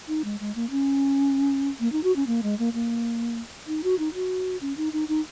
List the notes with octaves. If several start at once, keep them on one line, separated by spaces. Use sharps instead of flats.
D#4
G#3
G#3
A#3
C#4
A#3
D#4
F#4
C#4
A#3
G#3
A#3
A#3
D#4
F#4
D#4
F#4
C#4
D#4
D#4
D#4